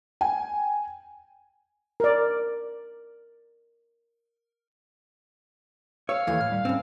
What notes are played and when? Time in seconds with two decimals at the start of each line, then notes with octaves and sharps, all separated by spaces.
0.21 G5 G#5
2.00 A#4 D5
6.09 C#5 F5 E6
6.27 D#2 E3 A3 G#6
6.41 A2 F6
6.52 G3
6.65 A2 C4 C#4